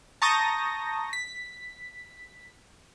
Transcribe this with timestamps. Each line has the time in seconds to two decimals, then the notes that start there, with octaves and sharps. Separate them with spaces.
0.22 A5 A#5 C#6 D#6 G6 A#6
1.13 B6